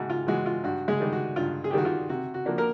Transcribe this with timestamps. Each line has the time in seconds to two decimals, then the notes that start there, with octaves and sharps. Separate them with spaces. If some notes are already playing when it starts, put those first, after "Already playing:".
Already playing: G#2 F#4
0.10 F4
0.27 E3 G#3 F#4
0.46 F4
0.64 G2 F#4
0.88 G#3 G#4
1.00 D#3 G3
1.12 F#4
1.36 G2 F4
1.64 G#4
1.70 G4
1.73 D#3 G3 F#4
1.85 F4
2.09 C3 F#4
2.34 F#4
2.45 F3 A#3 D4
2.58 A#3 A#4